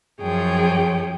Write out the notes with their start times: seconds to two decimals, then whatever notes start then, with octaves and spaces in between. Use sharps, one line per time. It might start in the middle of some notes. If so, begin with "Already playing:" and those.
0.21 F#2 F3 G#4 C#5 G5